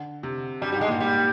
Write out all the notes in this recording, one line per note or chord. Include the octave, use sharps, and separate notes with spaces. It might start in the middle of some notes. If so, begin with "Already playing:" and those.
Already playing: D3
C3
G2 G3
G3
G#2
G#3
A#2 G3
G3